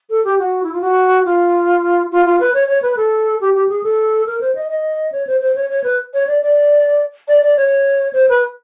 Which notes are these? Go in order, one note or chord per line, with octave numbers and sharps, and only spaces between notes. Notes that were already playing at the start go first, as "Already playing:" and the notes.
A4
G4
F#4
E4
F4
F#4
F4
F4
F4
B4
C#5
C#5
B4
A4
G4
G4
G#4
A4
A#4
C5
D#5
D#5
C#5
C5
C5
C#5
C#5
B4
C#5
D5
D5
D5
D5
C#5
C5
B4